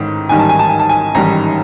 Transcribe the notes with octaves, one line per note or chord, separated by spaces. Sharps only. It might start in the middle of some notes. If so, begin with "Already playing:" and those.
Already playing: A1 G#2 D#3
A1 G#2 D#3 G3 G#5
A5
G#5
A5
G#5
A5
G#5
A1 G#2 D#3 G3 A#5